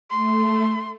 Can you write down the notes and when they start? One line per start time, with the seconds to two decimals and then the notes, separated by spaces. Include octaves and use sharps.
0.10 A3 C6